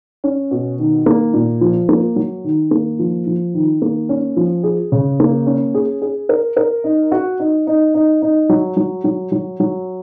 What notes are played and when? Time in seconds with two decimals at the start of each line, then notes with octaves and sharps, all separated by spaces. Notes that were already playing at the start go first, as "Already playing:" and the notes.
0.24 C#4
0.51 B2
0.79 D#3
1.06 A#3
1.34 A#2
1.61 F3
1.89 A#3
2.16 F#3
2.44 D#3
2.71 A#3
2.99 F3
3.27 F3
3.54 D#3
3.82 A#3
4.09 C#4
4.36 F3
4.63 G#4
4.92 C#3
5.20 A#3
5.47 C#4
5.75 G#4
6.02 G#4
6.29 A#4
6.57 A#4
6.84 D#4
7.12 F#4
7.40 D#4
7.67 D#4
7.95 D#4
8.22 D#4
8.49 F#3
8.77 F#3
9.04 F#3
9.32 F#3
9.60 F#3